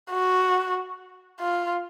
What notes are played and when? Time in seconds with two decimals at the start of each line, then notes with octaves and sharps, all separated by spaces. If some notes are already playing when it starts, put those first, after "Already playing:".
0.11 F#4
1.40 F4